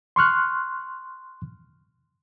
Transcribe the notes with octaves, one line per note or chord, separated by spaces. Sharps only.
C6 C#6 F6 F#6